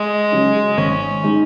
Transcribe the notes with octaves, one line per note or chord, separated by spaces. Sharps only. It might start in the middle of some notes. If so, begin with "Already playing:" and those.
Already playing: G#3
C#3 F#3 C#4 G#4
G#1 C#4
G#3 D#4